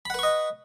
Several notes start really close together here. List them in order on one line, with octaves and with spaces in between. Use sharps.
B5 F#5 B4 C#6 D#5